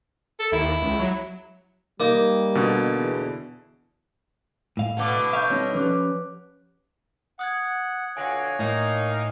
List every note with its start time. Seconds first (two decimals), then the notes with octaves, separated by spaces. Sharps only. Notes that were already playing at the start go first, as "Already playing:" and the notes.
0.39 A4
0.52 D#2 E4
0.82 C#2
0.99 F#3
2.00 G3 A#3 D#4
2.55 B2 D3
2.97 E2
4.77 A2 F5
4.97 B2 D3 A3 F#5 D6
5.33 E5 F5 C#6 G6
5.50 G3 C4 D#4 C#5
5.74 F3 C#4 G4 B4 D6 F#6
7.39 F#5 D#6 F#6 G#6
8.17 F2 B2 D3 C#5 F5 G#5 A#6
8.59 A2 A#3 D#4